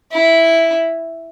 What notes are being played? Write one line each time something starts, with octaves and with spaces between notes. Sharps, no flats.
E4